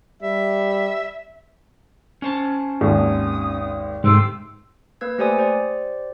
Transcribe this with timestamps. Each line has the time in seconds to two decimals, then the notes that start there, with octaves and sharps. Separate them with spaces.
0.22 G3 E5
2.22 C#4 C5 A5
2.81 G#1 D#2 D#6
4.04 G#2 C3 D#3 A3 G4 C6 E6
5.01 A#3 B4 E6 G#6
5.18 A3 G4 C5 D5 G#5 D#6
5.37 G4 C5 D5